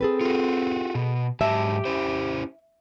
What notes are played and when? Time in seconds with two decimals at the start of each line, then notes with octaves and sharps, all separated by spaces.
0.01 C4 G#4 A4 B4
0.21 F4 F#4
0.95 B2
1.41 G#2 F#3 G4 E5 A5
1.85 C#4 E4 C5